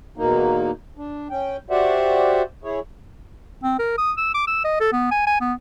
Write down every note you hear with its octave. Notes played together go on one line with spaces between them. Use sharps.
E2 B2 A#3 D#4
D4
C#4 G5
F#4 G4 C5 D5 E5 F#5
E4 G#4 C#5
C4
A#4
D#6
E6
D6
E6
D#5
A4
B3
G#5
G#5
B3